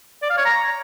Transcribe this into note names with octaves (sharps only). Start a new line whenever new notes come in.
D5
F5
C#5
A#5